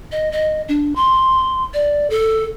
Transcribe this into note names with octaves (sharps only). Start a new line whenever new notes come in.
D#5
D#5
D4
C6
D5
A4